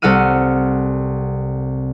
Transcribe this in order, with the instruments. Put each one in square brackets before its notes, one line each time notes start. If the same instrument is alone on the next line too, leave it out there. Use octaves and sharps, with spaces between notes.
[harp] C2 A4 F#5 F6 D#7